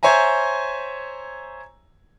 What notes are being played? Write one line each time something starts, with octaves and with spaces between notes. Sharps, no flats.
C5 C#5 E5 G#5 A#5